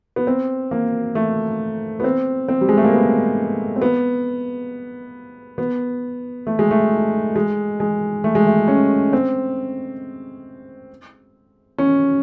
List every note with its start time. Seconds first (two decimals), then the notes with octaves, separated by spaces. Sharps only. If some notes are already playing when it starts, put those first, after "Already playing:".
0.16 B3
0.27 C4
0.71 A#3
1.15 A3
2.00 B3
2.04 C4
2.48 C4
2.61 G3
2.69 G#3
2.77 A3
2.84 A#3
2.93 B3
3.76 C4
3.82 B3
5.58 B3
6.47 A3
6.59 G#3
6.71 A3
7.36 G#3
7.80 G#3
8.24 A3
8.35 G#3
8.47 A3
8.68 C#4
9.13 C4
11.78 C#4